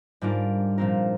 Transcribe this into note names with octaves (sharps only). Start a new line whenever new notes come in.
G#2 G3 D4 F4 A#4
A#2 F3 C4 F4 A#4